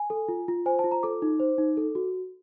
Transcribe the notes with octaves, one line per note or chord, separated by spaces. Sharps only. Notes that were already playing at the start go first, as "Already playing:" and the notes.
Already playing: G#5
A4
F4
F4
C5 G#5
A5
F4
A#5
A4 D6
D#4
C5
D#4
A4
F#4